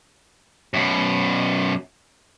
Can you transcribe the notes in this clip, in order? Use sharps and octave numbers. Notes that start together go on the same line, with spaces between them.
F#2 B2